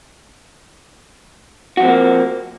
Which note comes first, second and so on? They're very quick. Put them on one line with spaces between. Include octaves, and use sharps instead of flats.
F#4 F3 C4 A3 A#3